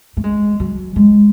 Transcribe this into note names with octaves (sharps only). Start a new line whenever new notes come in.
A3
G#3
F#3
G#3